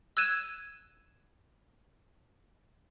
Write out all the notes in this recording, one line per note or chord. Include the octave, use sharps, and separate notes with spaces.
E6 F#6 G#6 D#7 E7